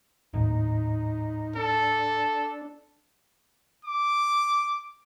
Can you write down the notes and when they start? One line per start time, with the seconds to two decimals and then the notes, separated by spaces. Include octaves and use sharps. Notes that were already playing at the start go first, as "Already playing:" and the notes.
0.33 G#1 D#2 A2 D#4
1.56 D4 A4
3.85 D6